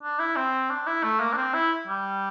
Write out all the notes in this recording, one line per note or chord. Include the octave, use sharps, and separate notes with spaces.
D4
E4
C4
D4
E4
A3
A#3
D4
C4
E4
G3